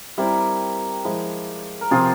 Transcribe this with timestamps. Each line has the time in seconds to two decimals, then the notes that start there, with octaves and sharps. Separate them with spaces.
0.18 G3 C4 E4 G4 A#4
1.05 F3 G#3 E4
1.81 A#4
1.91 C3 F3 C4 F4 G#4